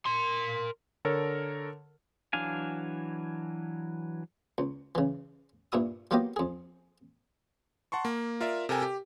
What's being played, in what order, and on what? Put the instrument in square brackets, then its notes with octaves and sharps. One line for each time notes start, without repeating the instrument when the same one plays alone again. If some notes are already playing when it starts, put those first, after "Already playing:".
[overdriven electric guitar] A#4 C6
[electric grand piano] D3 A4 A#4 C#5
[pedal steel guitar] E3 F#3 D4 F5 G#5
[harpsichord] C#2
C#3 E3
G2 A#2 E4 D#6
F#3 A#3 B3 F4 G4 D#5
F2 G#4
[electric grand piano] F#5 A5 C6 C#6
A#3
F4 A#4 D5 E5
C3 A4 A#4 G5 G#5
G4